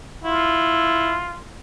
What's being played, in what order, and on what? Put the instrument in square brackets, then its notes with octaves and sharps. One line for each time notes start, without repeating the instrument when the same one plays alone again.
[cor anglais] E4 [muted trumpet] F4